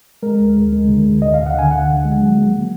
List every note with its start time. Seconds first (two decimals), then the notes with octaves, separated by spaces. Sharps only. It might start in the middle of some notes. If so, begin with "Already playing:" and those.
0.23 G#3 A#4
0.39 D2
0.56 D2
0.72 G#3
0.88 D3
1.06 D2
1.22 D2 D#5
1.34 D2 F5
1.46 F#5
1.54 D3 G#5
1.71 D2 F#5
1.87 D3
2.05 G#3
2.21 F#3
2.38 A#3
2.54 F#3